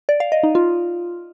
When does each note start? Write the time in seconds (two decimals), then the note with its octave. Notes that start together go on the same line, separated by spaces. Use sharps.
0.09 D5
0.20 F5
0.32 D#5
0.43 D#4
0.55 F4